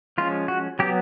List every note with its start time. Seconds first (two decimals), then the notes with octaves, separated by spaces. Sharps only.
0.18 F3 G#3 C#4 F4
0.48 F#4
0.79 F#3 B3 G4